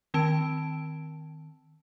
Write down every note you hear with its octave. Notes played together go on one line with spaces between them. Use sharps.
D#3 C4 A5 D7